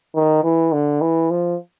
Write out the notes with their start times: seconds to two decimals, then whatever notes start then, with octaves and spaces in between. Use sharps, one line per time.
0.16 D#3
0.43 E3
0.72 D3
1.02 E3
1.31 F3